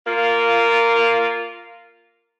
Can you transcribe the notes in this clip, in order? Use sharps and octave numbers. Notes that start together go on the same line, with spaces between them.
A#3 F4